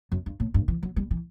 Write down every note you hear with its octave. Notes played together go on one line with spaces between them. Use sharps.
F#2
G2
A2
G2
E3
F#3
G3
E3